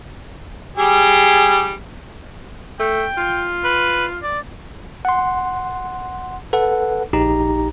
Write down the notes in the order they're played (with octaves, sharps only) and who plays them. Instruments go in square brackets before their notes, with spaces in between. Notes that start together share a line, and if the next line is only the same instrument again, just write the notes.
[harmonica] G3 G4 G#4
[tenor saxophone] A3 [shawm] G5
[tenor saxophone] F4
[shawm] B4
D5
[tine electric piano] F#5 C6
A4 B4 F#5
A#1 D#4 G4 A#5